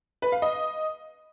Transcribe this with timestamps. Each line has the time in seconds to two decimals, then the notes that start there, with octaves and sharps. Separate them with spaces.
0.22 B4
0.32 F5
0.42 D#5